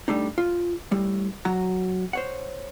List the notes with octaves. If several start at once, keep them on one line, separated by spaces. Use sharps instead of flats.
G3 A3 D4 D#4
F4
A2 G3
F#3 F#4 A#5
C5 C#5 F#5